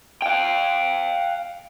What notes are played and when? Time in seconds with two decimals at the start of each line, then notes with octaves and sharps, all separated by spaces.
0.22 F5 G5